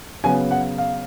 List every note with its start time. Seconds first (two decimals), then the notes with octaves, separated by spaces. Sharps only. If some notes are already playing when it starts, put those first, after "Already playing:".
0.24 C#3 F#3 B3 G#5
0.51 F#5
0.78 F5